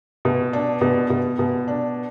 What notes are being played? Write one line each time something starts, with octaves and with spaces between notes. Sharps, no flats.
B2
D4
B2
B2
B2
D4